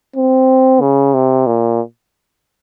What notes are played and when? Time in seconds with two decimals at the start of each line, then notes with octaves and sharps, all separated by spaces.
0.16 C4
0.81 C#3
1.14 C3
1.46 A#2